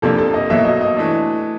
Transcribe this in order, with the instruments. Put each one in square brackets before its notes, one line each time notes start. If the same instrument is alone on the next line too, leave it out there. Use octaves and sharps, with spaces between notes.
[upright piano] F2 C3 F3 A#3 D4 [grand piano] A4
[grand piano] A4
D#5
[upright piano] B2 F#3 A#3 [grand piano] E5
[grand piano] D#5
D#5
[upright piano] E3 A3 D4